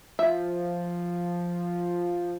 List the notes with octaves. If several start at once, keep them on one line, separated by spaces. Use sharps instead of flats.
F3 E5